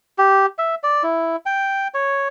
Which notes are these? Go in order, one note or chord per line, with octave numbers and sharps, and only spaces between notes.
G4
E5
D5
E4
G5
C#5